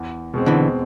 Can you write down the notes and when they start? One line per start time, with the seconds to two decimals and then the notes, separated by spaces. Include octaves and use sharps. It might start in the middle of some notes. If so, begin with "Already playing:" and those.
Already playing: E2
0.34 B2 G#3 C4
0.46 D3 E3